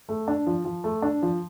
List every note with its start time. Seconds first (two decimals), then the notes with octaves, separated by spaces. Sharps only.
0.09 A3
0.28 D4
0.47 F3
0.65 F3
0.84 A3
1.02 D4
1.23 F3